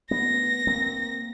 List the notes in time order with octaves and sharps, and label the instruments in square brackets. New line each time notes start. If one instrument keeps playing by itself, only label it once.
[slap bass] A3 B3 [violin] A#6
[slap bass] A#3 C4